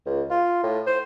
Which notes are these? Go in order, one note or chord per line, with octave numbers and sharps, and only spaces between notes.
C#2
F4
A2
C5